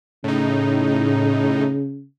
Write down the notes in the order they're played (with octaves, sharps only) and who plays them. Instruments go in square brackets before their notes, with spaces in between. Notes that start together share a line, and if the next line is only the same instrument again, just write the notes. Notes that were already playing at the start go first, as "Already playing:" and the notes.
[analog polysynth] A2 D#4 [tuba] C#3